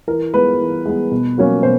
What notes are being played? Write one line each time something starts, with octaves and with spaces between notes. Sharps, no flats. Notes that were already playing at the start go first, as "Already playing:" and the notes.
E3 A#4
G#3 B3 B4
E3
G#3 B3
B2
F#3 A#3 C#4
B2 C5